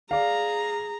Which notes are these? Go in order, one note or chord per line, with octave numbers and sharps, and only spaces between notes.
G#4 D5 F5 A#5